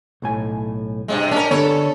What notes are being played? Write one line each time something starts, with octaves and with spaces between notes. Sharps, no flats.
B1 A2 G#5
G2 C3 G#3
C#4 D4 A#4
D3 B3 A4 C#5